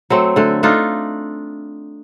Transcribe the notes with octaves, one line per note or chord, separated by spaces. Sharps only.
F#3 A3 C4
D3 A3
A3 D4 D#4 F4